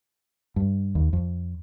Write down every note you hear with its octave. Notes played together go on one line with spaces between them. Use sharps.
G2
D#2
F2